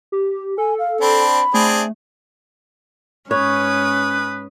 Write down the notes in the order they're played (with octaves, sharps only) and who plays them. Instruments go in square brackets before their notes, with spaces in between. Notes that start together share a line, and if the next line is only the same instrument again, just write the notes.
[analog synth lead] G4
[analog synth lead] A4 [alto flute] G#5
[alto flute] F5
[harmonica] C4 D4 [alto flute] B5
[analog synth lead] A3 [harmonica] C4 D4 G#4
[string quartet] G#2 D#6 [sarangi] C#4 [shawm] B4 [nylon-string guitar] C#5